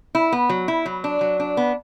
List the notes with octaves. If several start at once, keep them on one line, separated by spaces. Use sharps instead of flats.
E4
B3
F#3
E4
F#3
D4
F#3
D4
B3